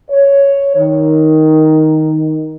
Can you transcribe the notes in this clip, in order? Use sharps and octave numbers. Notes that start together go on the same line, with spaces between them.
C#5
D#3